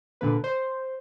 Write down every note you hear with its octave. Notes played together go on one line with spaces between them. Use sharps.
A#2 D3 A#3 B4
C5